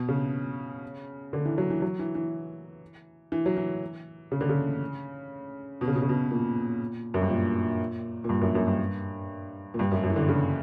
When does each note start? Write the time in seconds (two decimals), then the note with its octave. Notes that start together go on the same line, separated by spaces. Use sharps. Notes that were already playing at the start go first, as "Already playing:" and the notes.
Already playing: B2
0.09 C#3
1.33 D3
1.45 E3
1.58 F#3
1.70 E3
1.82 F#3
1.99 E3
2.15 E3
3.32 E3
3.46 F#3
3.57 E3
4.32 C#3
4.41 D3
4.49 C#3
5.81 B2
5.88 C#3
5.95 B2
6.02 C#3
6.09 B2
6.31 A#2
7.14 F#2
7.22 G2
7.30 A#2
8.24 A#2
8.29 G2
8.41 F#2
8.55 F#2
8.67 G2
9.74 A#2
9.79 G2
9.91 F#2
10.03 F#2
10.10 E3
10.16 D3
10.28 C#3